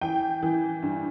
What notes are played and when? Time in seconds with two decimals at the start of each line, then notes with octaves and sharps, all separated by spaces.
0.01 E3 G5
0.42 E3
0.82 G2